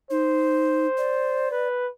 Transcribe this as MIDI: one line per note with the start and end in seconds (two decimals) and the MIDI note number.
0.11 0.86 63
0.11 1.49 72
0.98 1.68 74
1.51 1.89 71